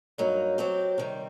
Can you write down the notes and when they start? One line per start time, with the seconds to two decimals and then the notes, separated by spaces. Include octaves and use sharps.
0.18 G2 F#3 A#3 D#4
0.58 F#3 C4 G4
0.98 C3 D#3 G3 C4